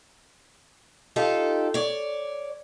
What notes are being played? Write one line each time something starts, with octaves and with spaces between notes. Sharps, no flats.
D#4 F4 G4 A4
C#5 D5